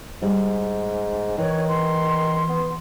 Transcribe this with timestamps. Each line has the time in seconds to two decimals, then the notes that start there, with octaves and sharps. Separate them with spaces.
0.22 G#2 G3
1.38 D#3 E3 C#5
1.67 C6
2.49 B3